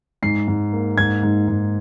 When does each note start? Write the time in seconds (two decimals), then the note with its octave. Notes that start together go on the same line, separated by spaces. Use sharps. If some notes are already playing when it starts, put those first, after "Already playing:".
0.22 G#2 C7
0.48 G#2
0.73 A#3
0.98 G#2 G#6
1.23 G#2
1.48 G#2